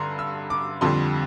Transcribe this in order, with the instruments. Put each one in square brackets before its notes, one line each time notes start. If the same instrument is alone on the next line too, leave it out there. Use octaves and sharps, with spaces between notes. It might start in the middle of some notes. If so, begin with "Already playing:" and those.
Already playing: [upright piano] G2 D3 A#5 C6
E6
D6
F2 D3 G3 C6